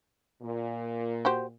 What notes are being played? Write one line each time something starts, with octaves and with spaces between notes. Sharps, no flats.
A#2
F#4 G4 C5